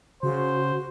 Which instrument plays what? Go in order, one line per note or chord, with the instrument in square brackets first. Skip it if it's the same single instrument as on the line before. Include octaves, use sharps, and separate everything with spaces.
[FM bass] C#3 [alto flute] F#4 [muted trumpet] C5